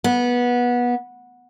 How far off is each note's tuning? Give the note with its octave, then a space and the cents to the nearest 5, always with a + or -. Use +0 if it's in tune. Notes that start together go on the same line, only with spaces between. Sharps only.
B3 -20